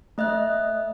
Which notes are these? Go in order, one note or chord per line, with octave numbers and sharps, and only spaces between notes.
A3 D#5 E5 F#6